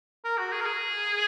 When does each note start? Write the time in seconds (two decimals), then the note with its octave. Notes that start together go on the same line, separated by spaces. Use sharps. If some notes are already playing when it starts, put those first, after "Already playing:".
0.24 A#4
0.38 F#4
0.52 G#4
0.61 A#4
0.66 G#4